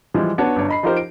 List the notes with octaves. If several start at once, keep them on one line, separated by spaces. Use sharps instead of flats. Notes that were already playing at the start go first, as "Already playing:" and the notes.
E3 F3 G3 G#3
B3 D4 F#4 C#5 A5
G1 D4 C#5
D#5 B5 C7
F3 D#4 F4 G4 A#4 C5
D7